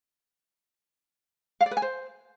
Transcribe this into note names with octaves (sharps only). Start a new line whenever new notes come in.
F5
D5
B4
G#5
C5